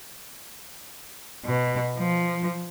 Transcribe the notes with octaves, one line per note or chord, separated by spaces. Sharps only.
B2
F3